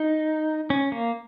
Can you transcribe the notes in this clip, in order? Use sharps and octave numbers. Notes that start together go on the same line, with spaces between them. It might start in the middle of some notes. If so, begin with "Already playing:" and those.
Already playing: D#4
C#4
A#3